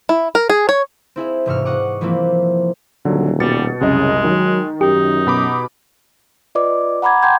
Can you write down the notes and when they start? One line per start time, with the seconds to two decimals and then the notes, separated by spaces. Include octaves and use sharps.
0.09 E4
0.35 A#4
0.50 G#4
0.69 C#5
1.16 C4 E4 G#4 E5
1.46 E1 G#2 C3 C#6 E6 F6
1.65 D#5 F#5 C#6 D6
2.01 E3 F3 G3 A#3 C4 E4
3.05 D#1 D3 F#3
3.40 B2 G3 A6 C#7
3.81 C2 F#2 C#3 G#3 D#5
4.24 D#3 F#3
4.81 F#2 D#4 G4
5.27 B2 B5 D6
6.55 F4 B4 D5 D#5 D6
7.02 F#5 A#5 B5 D6 G#6
7.23 F#5 G5 A5 C6 G6 G#6